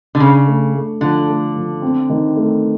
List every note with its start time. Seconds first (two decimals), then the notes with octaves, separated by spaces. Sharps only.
0.15 D3
0.20 C#3 D4
0.47 A3
0.74 A3
1.01 D3 F3
1.29 A3
1.55 F3
1.82 C4
2.09 D#3
2.37 A3